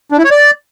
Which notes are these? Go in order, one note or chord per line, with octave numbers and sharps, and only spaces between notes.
D4
E4
C#5
D5